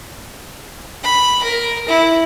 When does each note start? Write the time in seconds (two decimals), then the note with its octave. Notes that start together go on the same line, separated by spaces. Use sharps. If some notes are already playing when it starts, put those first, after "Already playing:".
1.03 B5
1.43 A#4
1.88 E4